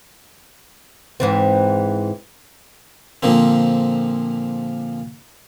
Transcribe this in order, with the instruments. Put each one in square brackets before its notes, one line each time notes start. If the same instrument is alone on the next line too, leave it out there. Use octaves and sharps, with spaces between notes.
[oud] G#2 E3 C4
[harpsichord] A#2 D3 F3 A#3 C4